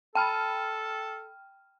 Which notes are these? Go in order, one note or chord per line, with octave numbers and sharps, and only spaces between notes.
A4 G5 A5 B5 F6